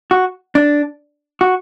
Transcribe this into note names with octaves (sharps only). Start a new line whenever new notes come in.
F#4
D4
F#4